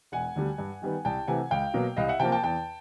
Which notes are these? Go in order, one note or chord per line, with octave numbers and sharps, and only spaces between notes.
E1 F#5 G#5
D2 D3 G3
G2
D#3 G3 B3
C2 G5 A5
C3 E3 A3 F#5 G#5
C#2 F5 G5
B2 F#3 A#3
C2 D#5 F5
E5 F#5
C3 F3 A#3 G5 A5
G5 A5
E2 G5 A5